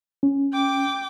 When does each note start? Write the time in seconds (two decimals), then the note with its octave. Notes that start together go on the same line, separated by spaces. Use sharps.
0.23 C#4
0.53 G5 D6